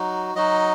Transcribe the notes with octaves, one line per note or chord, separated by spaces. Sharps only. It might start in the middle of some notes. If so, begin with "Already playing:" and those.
Already playing: F#3 D#4 F#4
F#3 D#4 F#4 D#5